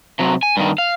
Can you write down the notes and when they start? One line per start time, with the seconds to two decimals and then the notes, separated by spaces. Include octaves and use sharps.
0.19 C3 F#3
0.43 G#5
0.57 G2 D#3
0.78 F5